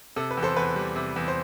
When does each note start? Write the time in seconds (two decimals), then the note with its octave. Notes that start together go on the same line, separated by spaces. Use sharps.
0.16 C3 A4
0.31 B4
0.37 E2
0.43 A4 C5
0.56 E2 B4
0.76 G3
0.96 C3
1.16 E2
1.28 C5